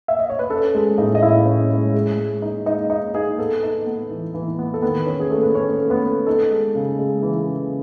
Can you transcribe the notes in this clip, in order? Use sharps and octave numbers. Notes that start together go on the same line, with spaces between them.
E5
D#5
C#5
B4
C#4 A4
G#3
A2 D#4 D#5
D#5
A2 E4 E5
C#4
G#3
G#3
G#3
D#4
G#3 D#4 D#5
D#4 D#5
D#4 G#4
B3 A4
D#4
B3
E3
E3
B3
A4
D#3 B3 B4
C#4
G#4
A3 A4
B4
A3 C#4 C#5
A3
B3 B4
A3
D#4 A4
G#3
C#3
G#3
E3
C#3